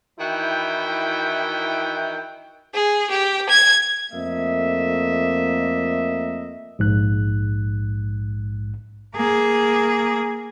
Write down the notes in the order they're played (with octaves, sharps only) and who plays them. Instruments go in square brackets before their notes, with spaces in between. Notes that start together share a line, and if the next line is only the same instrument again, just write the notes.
[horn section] D#3 E3 E4 F#4 G5
[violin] G#4
G4
G#6
[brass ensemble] F2 A3 A#3 D#5 E5
[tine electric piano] A#1 G#2 F#6
[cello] A#3 G#4